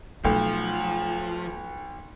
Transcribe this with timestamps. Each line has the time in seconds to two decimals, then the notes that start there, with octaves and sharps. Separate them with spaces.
0.25 B1 F3 A3